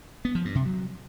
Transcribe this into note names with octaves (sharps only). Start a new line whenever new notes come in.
B3
F3
G2
C3
F#3